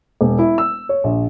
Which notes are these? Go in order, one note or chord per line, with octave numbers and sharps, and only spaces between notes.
E1
E4
E6
C#5
A#1